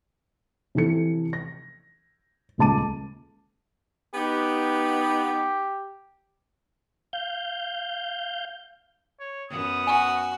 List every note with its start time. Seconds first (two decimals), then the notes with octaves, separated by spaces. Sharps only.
0.75 C3 E3 A4 C#7
1.33 A#6
2.58 D#1 C#2 G#3 A5 D6 D#7
4.14 B3 D#4 G4
7.13 F5 G6
9.20 C#5
9.50 F#2 B3 D#6
9.87 F#4 G#5